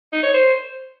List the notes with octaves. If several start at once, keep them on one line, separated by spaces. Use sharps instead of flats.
D#4
C#5
C5